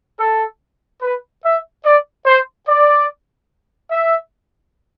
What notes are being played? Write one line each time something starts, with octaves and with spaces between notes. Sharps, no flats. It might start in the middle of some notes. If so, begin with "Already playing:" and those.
A4
B4
E5
D5
C5
D5
E5